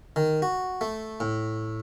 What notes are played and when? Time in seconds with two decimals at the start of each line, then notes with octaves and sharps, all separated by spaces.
0.16 D#3
0.42 F#4
0.81 A3
1.20 A2